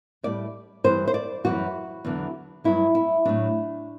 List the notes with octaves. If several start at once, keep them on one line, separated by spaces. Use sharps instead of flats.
A2 G3 D5
G2 E3 G3 C5
C5
D5
F#2 E3 G3 F#4
E2 D3 F#3
G2 F#3 E4
E4
A2 F#3 D4